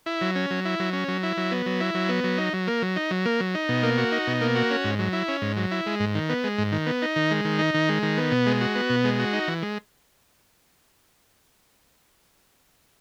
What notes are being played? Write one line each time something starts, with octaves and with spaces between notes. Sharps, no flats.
E4
F#3
C#4
F#3
E4
F#3
C#4
F#3
E4
F#3
B3
F#3
E4
F#3
B3
F#3
D#4
F#3
A#3
F#3
D#4
F#3
A#3
F#3
D#4
B2
A#3
F#4
D#4
B2
A#3
F#4
C#4
G#2
F#3
E4
C#4
G#2
F#3
E4
G#3
G#2
D#3
B3
G#3
G#2
D#3
B3
D#4
D#3
G#3
D#3
D#4
D#3
G#3
D#3
B3
B2
G#3
F#4
B3
B2
G#3
F#4
D#4
E3
G#3